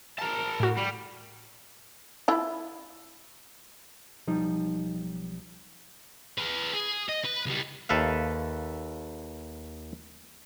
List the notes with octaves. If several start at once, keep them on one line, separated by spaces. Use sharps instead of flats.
A#4 A5
A2 F#4
G3
E4 F4
B1 F3 G3 D#4
G#4 B4
G#4
D#5
B4
C#2 G3
D#2 A4 B4 E5 F5